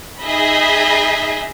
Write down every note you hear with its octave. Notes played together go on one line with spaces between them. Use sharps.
D#4 G#4 D#5 E5 B5